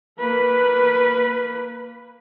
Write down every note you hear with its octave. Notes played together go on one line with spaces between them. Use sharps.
A#3 B4